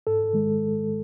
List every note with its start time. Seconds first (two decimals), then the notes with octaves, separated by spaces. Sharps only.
0.07 G#2 A4
0.33 D#3 G#3